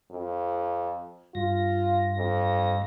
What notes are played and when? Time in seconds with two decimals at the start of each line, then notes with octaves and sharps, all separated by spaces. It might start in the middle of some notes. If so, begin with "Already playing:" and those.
0.11 F2
1.35 G2 F4 A#6
2.17 F2